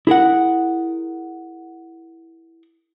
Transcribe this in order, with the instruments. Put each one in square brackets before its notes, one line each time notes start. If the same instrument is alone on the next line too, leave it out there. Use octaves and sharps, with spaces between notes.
[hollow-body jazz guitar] E4 G#4 A#4 F#5